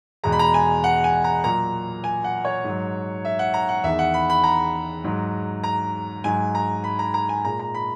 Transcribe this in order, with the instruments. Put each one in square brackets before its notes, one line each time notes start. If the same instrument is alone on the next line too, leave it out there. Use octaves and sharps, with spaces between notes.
[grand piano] E2 B2 G#3 A#5
B5
A#5
G#5
F#5
G#5
A#5
A#2 F#3 A#5
G#5
F#5
C#5
G#2 F#3
E5
F#5
A#5
F#5
E2 D#3 G#3 E5
F#5
B5
B5
A#5
G#2 F#3
A#5
G#2 F#3 G#5
A#5
B5
A#5
A#5
G#5
A#2 G#3 A#5
A#5
B5